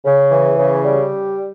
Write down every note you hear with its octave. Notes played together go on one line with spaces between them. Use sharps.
C#3
E3
C#3
G3